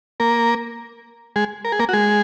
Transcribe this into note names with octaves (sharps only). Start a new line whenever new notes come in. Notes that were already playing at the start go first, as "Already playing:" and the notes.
A#3 A#4
G#3 G#4
A#4
G#4
A#3 A#4
F#4
G#3 G#4